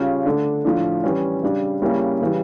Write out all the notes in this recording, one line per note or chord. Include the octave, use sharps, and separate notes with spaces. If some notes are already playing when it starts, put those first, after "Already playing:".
Already playing: C#3 G3 C#4 F4
D3 A3 D4
A2 F3 A3 D4
E3 G3 C#4
C#3 G3 D4
C#3 G3 A#3 C#4 E4
C#3 E3 G3